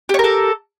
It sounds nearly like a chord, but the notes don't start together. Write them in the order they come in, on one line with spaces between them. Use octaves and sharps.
G4 C#5 A#4 A4